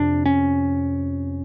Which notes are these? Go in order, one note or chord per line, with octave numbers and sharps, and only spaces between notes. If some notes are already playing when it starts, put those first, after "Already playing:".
Already playing: F2 C3 D4
C#4